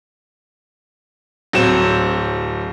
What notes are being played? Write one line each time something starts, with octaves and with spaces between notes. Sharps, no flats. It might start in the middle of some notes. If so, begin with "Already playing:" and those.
D1 F#3 C4 E7